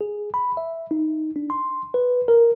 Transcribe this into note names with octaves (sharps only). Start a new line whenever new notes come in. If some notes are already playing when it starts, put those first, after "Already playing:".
G#4
B5
E5
D#4
D4
C6
B4
A#4